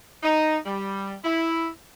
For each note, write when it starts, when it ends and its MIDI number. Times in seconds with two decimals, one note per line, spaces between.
0.23 0.57 63
0.66 1.14 55
1.24 1.68 64